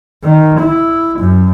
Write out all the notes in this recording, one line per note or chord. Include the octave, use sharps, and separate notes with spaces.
D#3
E4
F#2